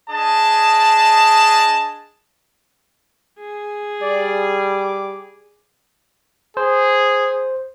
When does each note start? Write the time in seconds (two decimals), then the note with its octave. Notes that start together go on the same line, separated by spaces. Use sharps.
0.10 D4 G#4 D#5 A5
3.40 G#4
4.02 G3 D5
4.41 D6
6.57 G#4 C5